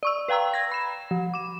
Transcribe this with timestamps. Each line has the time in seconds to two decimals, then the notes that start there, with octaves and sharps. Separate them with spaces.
0.03 D5 C#6 E6
0.28 B4 F5 G5 A#5 E6
0.54 G#6 A#6
0.72 B5 E7
1.11 F3
1.34 D6 E7